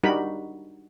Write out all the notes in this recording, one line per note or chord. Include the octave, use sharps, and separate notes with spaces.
G3 D4 D#4 F#4 A#4 B5